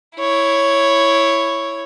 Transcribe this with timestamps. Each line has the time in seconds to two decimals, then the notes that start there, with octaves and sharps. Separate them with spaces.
0.18 E4 C#5